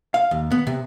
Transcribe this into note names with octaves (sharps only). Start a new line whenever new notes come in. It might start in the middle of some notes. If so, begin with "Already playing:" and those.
F5
D#2
B3
C3